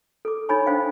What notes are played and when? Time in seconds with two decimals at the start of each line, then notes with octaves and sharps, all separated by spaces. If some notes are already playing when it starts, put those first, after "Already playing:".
0.25 A4 D6
0.49 D#4 A4 C#5 G#5 B5 C#6
0.66 D4 C5 F5 G5